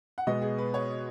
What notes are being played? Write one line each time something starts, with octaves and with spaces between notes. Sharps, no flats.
F#5
B2 G#3 B3 D#5
G#4
B4
C#5